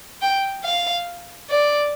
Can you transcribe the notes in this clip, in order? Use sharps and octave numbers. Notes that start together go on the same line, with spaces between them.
G5
F5
D5